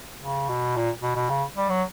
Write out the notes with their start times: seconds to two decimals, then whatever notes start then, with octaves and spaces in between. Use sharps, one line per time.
0.22 C#3
0.49 B2
0.76 A#2
1.03 B2
1.16 B2
1.29 C#3
1.56 G3
1.69 F#3